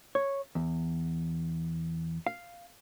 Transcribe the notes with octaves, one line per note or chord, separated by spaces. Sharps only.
C#5
E2
F5